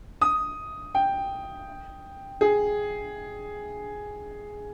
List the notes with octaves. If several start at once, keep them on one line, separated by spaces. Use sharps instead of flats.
D#6
G5
G#4